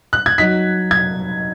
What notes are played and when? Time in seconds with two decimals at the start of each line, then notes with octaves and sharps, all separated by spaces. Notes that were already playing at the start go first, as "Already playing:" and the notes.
0.13 F#6
0.26 G#6
0.38 F#3 D#4 B6
0.91 G#6